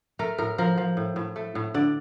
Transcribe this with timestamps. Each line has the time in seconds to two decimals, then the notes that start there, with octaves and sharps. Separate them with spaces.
0.19 A3 A#4
0.38 A2 A#4
0.58 F3 A#4
0.78 F3
0.97 A2
1.16 A2
1.36 A3
1.55 A2
1.74 D3 D5